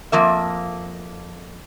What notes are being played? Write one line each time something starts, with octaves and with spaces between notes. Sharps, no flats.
F2 F3 A#3 E5